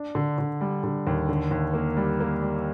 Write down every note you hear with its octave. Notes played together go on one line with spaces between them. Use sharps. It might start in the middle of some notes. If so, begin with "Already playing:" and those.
Already playing: D4
D3
D3
G3
D3
D#2
D3
D#2
A#3
G3
A#3
G3